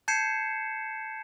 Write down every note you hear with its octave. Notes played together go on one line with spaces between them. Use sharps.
A5 G6 G#6 C7 C#7 E7